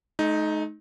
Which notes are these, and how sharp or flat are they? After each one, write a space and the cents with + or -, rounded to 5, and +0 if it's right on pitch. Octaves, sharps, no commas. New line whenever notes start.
A3 -45 D#4 +0